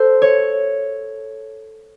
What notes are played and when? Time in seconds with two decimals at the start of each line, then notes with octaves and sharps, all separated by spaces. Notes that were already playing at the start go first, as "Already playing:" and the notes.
Already playing: A4 C5
0.22 C#5